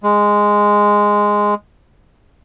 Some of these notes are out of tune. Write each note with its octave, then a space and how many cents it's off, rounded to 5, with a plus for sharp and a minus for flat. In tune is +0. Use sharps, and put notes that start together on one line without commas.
G#3 -5